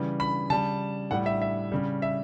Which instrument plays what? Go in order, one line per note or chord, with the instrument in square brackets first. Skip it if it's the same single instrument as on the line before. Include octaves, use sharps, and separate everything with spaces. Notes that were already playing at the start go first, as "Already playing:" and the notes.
Already playing: [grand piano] C#3 E3 G3
B5
C#3 G3 A5
A2 G3 F#5
E5
E5
C#3 G3
E5